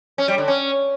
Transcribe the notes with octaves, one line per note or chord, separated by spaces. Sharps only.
C#4
G3
D3
C#4